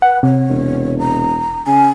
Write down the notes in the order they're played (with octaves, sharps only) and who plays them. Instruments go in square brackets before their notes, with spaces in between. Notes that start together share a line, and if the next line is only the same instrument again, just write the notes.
[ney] B4 [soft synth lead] F#5
[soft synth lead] C3 [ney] C#5
[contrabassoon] E1
[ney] A#5
[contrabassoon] C#3 [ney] G#5